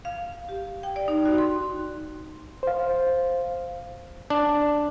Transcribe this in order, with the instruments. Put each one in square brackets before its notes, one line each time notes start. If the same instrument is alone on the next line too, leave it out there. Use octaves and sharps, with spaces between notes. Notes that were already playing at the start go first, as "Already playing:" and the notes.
[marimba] F5
G4
G5
D5
D#4
F#4
C6
[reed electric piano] C5 F5
[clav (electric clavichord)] D4